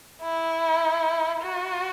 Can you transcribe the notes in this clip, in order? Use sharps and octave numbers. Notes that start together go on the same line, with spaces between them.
E4
F#4